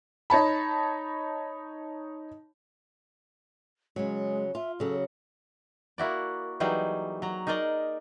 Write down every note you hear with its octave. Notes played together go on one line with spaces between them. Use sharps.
D#4 C#5 A5 B5
C#3 F#3 G#3
F4 E5
C#3 F#3 A4
A#3 E4 F#4 D5
E3 F#3 G3 D#4 G#4
F#3 A#5
D#4 G#4 A#4 D5 D#5